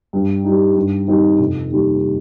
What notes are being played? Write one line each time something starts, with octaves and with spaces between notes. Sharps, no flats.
G2
G3 D#4
G2
D#3 G3 C4 D#4
F1
D#2 D#3 G3